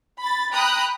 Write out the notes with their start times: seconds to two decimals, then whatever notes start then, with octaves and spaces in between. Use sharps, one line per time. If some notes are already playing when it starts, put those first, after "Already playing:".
0.20 B5 A6
0.52 G5 A#5 B5 D#6 F#6